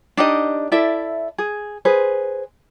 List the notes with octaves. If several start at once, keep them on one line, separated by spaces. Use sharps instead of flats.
D4 D#4 G4 D#5
E4 A4 D5 E5
G#4
G#4 B4 C5